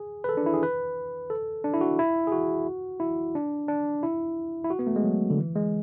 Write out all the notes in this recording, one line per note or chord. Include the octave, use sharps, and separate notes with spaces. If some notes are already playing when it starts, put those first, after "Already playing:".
Already playing: G#4
B4
A4
D4
E4
G#4
B4
A4
D4
E4
F#4
E4
G#4
F#4
E4
D4
D4
E4
E4
F#4
B3
A3
G#3
F#3
D3
E3
G#3